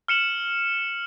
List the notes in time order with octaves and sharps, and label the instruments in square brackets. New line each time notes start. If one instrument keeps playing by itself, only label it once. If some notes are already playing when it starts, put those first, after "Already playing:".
[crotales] F6 C#7 E7 F#7